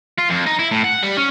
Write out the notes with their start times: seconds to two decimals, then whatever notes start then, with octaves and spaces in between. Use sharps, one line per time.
0.18 F4
0.29 F2
0.46 D#4
0.59 E4
0.71 A2
0.84 F#5
1.03 G3
1.17 C#4